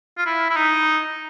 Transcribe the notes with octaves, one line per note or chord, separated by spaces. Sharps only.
F4
E4
E4
D#4